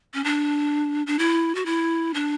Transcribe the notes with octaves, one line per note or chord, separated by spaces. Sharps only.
C#4
D4
D4
E4
F#4
E4
D4